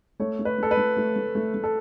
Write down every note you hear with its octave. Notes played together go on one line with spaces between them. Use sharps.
A3 C#5
A3
B4
A3 A4
B4
A3
A3
A3
A3
A3
A4